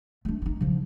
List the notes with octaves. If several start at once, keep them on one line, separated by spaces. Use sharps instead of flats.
A3 D4
D#4 E4
C#3 F3